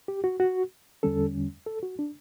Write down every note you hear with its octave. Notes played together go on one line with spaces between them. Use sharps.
G4
F#4
F#4
E2 D3 G3 C#4 A4
A4
F#4
D4